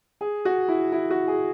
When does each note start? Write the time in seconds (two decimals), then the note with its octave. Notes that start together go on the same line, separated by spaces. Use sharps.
0.21 G#4
0.45 F#4
0.68 E4
0.92 E4
1.11 F#4
1.28 G#4